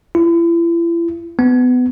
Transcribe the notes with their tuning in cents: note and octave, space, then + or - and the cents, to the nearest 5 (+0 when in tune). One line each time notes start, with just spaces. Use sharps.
E4 +40
B3 +20